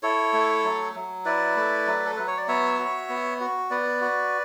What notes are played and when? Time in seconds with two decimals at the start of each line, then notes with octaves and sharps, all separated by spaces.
0.03 E4 A4 C#5
0.33 A3
0.64 F#3
0.95 F#3
1.25 E4 B4 D5
1.56 A3
1.87 F#3
2.06 A4
2.17 F#3 B4
2.27 C#5
2.37 D5
2.48 B3 C#5 E5
2.79 F#4
3.09 B3
3.40 F#4
3.70 B3 B4 D5
4.01 F#4